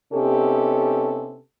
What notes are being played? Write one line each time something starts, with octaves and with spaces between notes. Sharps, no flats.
C3 B3 C#4 D#4 G4 A4